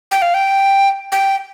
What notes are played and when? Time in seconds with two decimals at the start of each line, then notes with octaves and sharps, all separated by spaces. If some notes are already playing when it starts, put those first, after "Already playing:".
0.11 G5
0.22 F5
0.34 G5
1.12 G5